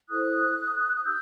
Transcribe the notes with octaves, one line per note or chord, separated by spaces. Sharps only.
E4 A4 C5 D#6 F#6
D#4 G4 E6 G6